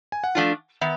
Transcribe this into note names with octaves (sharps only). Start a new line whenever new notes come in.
G#5
F#5
F3 A3 D4 F4
D#3 B3 E5